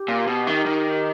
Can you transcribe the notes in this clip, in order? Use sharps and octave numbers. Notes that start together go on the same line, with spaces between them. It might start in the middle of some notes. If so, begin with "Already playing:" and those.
Already playing: G4
A#2
B2
D#3
D#3